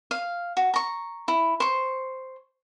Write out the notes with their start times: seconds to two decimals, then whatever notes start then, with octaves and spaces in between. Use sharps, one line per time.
0.11 F5
0.57 F#4
0.74 A#5 C#6
1.28 E4
1.60 C5 C#6